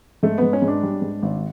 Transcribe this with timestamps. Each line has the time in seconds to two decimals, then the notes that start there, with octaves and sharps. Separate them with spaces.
0.23 G#2 A3
0.38 G#2 B3
0.53 C#4
0.62 G#2
0.68 D4
0.83 G3
1.02 G#2
1.23 G#1